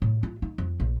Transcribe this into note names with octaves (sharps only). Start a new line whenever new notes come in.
A2
F4
D#4
F2
A#1